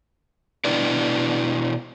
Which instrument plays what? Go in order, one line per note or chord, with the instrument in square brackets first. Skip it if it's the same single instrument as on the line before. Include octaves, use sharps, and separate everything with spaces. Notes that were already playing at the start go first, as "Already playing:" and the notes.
[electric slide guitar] B2 D4 E4 B4 D5